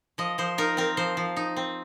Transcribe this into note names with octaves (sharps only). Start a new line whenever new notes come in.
F3 D#5
F3 C5
D#4 A#4
C4 A#4
F3 C5
F3
D#4
C4